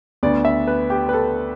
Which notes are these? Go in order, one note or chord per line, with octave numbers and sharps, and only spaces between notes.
D2 D3 B3 D5
E5
B4
G4
B4
A4